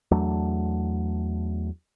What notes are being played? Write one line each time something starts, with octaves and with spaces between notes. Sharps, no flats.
E2 F#3 A3 D4